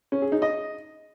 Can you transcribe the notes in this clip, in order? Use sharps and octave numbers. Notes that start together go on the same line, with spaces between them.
C#4
G#4
D#4
D#5